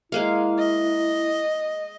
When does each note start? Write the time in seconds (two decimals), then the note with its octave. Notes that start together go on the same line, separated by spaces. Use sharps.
0.12 G#3 A#3 E4 F5
0.58 D#5